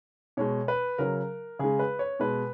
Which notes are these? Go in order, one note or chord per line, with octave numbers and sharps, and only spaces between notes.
B2 G#3 C#5
B4
C#3 F#3 A#4
C#3 G#3 G#4
B4
C#5
B2 G#3 B4